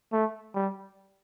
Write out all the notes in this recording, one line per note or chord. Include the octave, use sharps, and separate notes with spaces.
A3
G3